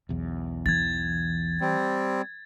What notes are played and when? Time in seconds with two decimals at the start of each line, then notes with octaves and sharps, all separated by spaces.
0.09 B1 E2
0.66 E3 G#6 A6
1.61 G3 C4